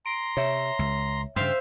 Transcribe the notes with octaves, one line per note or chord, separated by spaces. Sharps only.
A#5 C6 D7
C3 C#5 E5
C#2
G2 C#3 C5 E5 F5 G5 C6